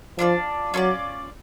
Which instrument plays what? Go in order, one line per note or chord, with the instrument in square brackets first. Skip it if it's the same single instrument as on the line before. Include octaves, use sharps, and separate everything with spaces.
[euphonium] F3 [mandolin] D4 F4 A4 D5
[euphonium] F#3 [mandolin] C#4 F4 A4 D5